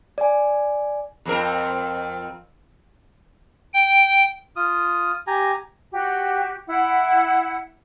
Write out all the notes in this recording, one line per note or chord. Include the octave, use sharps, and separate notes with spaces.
D5 G#5
F2 C4 A#4
G5
F4 D#6
G4 G#5 A#5
F#4 G4
E4 F#5